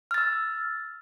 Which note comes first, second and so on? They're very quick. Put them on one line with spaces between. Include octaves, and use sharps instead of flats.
F6 A6 E6